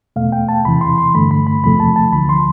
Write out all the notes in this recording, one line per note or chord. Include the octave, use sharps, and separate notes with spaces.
E2 B2 A3 F5
G5
A5
E2 C3 E3 B5
C6
C6
G2 D3 A3 B5
B5
B5
E2 C3 F3 A3 B5
A5
A5
D2 D3 F3 B5
C6